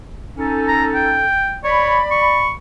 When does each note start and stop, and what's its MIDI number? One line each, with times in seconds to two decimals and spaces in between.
0.38 1.25 61
0.38 1.25 63
0.38 1.25 69
0.68 0.84 82
0.95 1.58 79
1.64 2.00 73
1.64 2.51 74
1.64 2.51 83
2.11 2.52 85